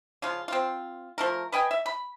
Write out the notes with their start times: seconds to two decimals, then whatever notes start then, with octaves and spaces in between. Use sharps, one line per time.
0.22 C#3 F3 F4
0.48 C4 F4
1.18 F3 A3 A#4
1.52 B4 D#5 G5 G#5
1.71 E5
1.86 B5